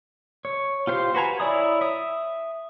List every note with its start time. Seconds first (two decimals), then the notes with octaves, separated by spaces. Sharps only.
0.45 C#5
0.87 F4 G4 C5 F5
1.15 F#4 B4 G#5 A#5
1.40 E4 C#5 D5 E5 D#6
1.81 E5 D#6